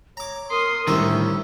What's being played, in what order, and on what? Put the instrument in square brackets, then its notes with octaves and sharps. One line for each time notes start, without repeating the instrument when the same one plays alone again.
[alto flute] C#5 [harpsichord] A#5 D6
[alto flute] A#4 [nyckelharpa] C6 D#6
[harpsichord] C2 E5 A#5 [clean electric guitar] A2 D3 D#3 [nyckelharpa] C#4 [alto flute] E4